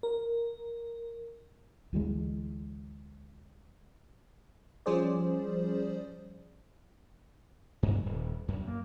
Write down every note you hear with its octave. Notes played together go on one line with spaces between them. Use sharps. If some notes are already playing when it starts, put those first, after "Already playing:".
A#4
D2 E3 F#3 G#3
F3 G3 C#4 G#4 C5 D5
G2
D#1
F#2
A#3